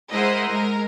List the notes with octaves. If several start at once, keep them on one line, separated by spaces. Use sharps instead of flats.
G#3 E4 A#4 C5 D#5 F#5
G#3 A#4